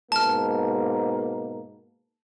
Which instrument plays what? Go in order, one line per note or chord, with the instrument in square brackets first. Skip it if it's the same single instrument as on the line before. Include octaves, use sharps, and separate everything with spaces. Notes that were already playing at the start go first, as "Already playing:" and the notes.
[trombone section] G#2 B2 A#3 [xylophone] A5 F6